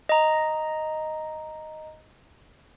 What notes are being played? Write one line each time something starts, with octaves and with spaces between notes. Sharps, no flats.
D#5 A#5